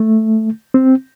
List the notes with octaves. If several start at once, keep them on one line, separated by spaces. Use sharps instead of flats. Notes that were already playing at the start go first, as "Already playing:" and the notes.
Already playing: A3
C4